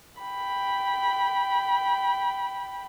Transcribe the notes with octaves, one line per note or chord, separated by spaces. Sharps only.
G5 B5